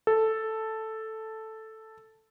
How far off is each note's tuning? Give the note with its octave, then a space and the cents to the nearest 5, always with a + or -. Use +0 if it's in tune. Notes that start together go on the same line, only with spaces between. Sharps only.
A4 +0